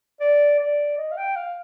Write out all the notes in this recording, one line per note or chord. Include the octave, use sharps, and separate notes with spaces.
D5
D5
D#5
F5
G5
F5